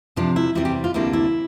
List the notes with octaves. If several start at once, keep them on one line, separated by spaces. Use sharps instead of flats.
E2 C3 F3 D4
E4
E2 C3 G3 C4 E4
G4
F4
D2 C3 G3 A#3 D4 E4
E4